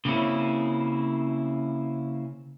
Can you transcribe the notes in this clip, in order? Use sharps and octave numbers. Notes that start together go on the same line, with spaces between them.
C#3 A#3 C4 C#4 E4